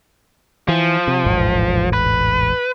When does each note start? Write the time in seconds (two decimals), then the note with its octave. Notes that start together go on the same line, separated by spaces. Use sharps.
0.68 E3 F3
1.08 C3
1.24 E1 A1 G#2
1.93 B4